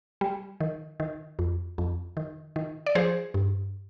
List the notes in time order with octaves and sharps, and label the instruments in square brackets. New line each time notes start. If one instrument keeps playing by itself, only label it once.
[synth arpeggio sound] G3
D#3
D#3
F2
F2
D#3
D#3
D5
F3 G#4 C5
G2